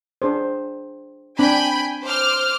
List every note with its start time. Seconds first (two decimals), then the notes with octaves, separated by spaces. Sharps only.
0.22 D4 G#4 C5
1.39 C4 D4 G5 G#5 B5
2.04 C5 D6 F6